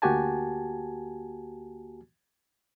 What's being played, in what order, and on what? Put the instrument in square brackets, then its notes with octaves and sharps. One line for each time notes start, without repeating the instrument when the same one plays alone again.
[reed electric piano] D2 A#3 F#4 G4 G#5 A5